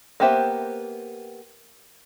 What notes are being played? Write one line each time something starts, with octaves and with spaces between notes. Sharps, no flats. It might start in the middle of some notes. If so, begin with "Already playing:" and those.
A#3 B3 G4 C5 E5